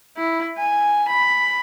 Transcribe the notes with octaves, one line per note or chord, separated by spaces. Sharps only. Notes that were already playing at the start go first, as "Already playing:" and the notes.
E4
G#5
B5